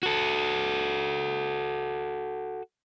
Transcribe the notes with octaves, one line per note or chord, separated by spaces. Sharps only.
F#4 A4